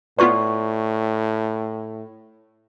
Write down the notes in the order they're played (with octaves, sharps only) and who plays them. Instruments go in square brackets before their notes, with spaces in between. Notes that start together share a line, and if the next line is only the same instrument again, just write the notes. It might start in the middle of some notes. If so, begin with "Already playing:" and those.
[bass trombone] A2 [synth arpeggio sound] B3 F4 B4 [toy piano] D5 C#6